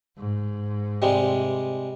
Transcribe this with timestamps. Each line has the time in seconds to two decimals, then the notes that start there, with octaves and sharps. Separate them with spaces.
0.18 G#2
1.02 C3 G3 G#3